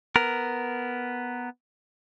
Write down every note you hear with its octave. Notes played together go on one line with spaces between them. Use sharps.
B3 A#4